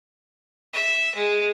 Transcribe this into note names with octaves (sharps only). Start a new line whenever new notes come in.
E5
G#3